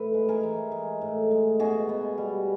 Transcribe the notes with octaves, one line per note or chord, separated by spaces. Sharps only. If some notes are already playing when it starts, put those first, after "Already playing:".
Already playing: A2 B4
G#3
G#4 A#4
E3
G#3
A2
G#3
B2 F#4 G#4
B3
G3